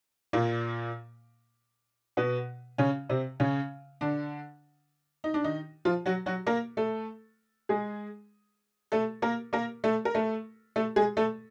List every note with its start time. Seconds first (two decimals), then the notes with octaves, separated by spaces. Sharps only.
0.33 A#2 A#3
2.17 B2 B3
2.78 C#3 C#4
3.09 C3 C4
3.40 C#3 C#4
4.01 D3 D4
5.24 D#4
5.34 D4
5.44 D#3 D#4
5.85 F3 F4
6.06 F#3 F#4
6.26 F#3 F#4
6.47 A#3 A#4
6.77 A3 A4
7.69 G#3 G#4
8.92 A3 A4
9.22 A#3 A#4
9.53 A#3 A#4
9.84 A3 A4
10.05 A#4
10.14 A3 A4
10.76 A3 A4
10.96 G#3 G#4
11.17 A3 A4